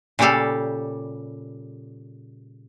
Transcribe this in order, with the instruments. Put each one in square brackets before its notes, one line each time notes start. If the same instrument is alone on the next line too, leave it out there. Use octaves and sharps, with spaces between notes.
[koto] A#2 C#3 G3 G4 A4 F5